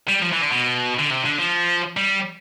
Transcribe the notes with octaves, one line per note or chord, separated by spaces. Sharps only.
G3
F3
E3
D3
B2
D3
C3
D3
F3
G3